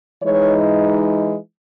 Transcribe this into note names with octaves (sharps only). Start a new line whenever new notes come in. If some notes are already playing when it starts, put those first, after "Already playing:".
E3 G#3 D#4 C#5